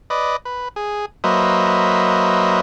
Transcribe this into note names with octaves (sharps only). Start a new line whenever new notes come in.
B4 D5 D#5
B4
G#4
F#3 A#3 B4 C5 D#5 E5